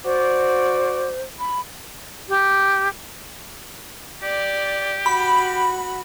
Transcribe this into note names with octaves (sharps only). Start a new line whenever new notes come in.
F#4 C5 D5
B5
G4
G4 D5
F#4 B5